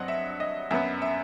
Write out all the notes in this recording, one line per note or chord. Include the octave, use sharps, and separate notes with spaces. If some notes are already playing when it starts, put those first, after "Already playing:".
Already playing: G2 F#3 C4 D#5 F#5
E5
D#5
F#2 F#3 B3 E5
E5